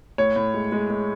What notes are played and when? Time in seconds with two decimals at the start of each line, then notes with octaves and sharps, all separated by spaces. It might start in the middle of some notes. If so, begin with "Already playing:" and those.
0.18 A2 C#5
0.36 A2
0.54 G#3
0.72 G#3
0.90 G#3